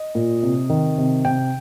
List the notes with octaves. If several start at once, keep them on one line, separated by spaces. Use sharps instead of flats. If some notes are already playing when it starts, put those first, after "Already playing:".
Already playing: D#5
A#2
C3
D#3
C3
C3 G5